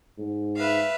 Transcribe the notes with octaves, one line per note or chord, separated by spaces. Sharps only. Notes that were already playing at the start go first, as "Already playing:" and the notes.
G#2
B4 E5 F5